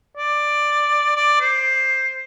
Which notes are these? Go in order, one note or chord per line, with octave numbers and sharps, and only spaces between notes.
D5
D5
C5